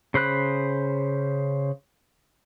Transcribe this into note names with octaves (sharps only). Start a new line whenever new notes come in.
C#3 C5 B5 F#6